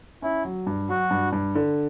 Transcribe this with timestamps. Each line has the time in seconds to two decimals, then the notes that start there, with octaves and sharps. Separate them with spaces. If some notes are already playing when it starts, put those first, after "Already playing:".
0.22 C#4 E4
0.45 F#3
0.67 G2
0.89 F#3 F#4
1.11 G2
1.32 G2
1.55 D3